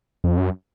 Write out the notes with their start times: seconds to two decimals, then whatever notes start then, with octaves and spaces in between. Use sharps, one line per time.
0.24 F2
0.38 F#2